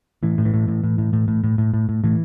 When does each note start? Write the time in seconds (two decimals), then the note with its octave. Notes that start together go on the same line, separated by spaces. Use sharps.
0.23 A2 E3
0.38 A2
0.45 E3
0.54 A2
0.68 A2
0.84 A2
0.98 A2
1.13 A2
1.28 A2
1.44 A2
1.58 A2
1.74 A2
1.89 A2
2.04 A2 E3